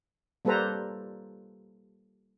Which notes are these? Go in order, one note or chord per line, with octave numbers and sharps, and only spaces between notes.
G3 A#3 A4 B4 C5 A#5